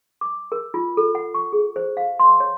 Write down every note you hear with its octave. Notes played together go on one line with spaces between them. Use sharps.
D6
A#4
F4
A4
F#5
C#6
G#4
C5
F5
C6
C#5